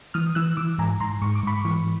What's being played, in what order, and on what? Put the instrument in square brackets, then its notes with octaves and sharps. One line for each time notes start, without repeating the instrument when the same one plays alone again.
[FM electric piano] E3 D#6 F6
E3 E6 F#6
E3 D6 E6
G#2 G#5 A#5
G#2 A#5 C6
G#2 C#6
D6
G#2 B5 C#6
E3